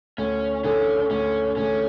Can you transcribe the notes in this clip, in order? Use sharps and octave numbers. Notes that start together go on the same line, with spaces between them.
D2 C#4
D3 A3 C#4 D4 G#4
D2 C#4
D3 A3 C#4 D4 G#4